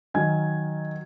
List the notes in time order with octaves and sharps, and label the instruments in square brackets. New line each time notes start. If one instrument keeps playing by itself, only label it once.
[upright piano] D#3 F#3 D#4 G#5 G#6